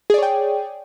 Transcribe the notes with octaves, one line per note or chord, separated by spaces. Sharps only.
G#4 C#5 D5 G5